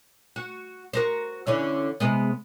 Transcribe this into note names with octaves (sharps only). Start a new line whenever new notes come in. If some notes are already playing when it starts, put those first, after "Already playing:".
F#4
F#4 A#4 C5
D3 E3 C#4
C3 G#3 B3